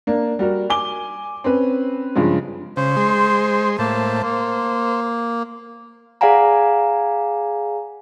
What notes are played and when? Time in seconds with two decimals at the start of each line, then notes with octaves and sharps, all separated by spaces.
0.07 A#3 D4
0.39 G3 F#4 A#4
0.70 G#5 D6 G7
1.44 C4 C#4 B4
2.16 G2 C#3 F3 G#3
2.77 C#3 C5
2.97 G#3 C6
3.79 A2 A#3 C5 A5
4.23 A#3 C5
6.21 G#4 D5 F5 F#5 G#5 A#5